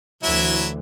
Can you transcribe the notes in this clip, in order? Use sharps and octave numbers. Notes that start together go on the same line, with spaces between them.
D2 E3 F#3 E4 E5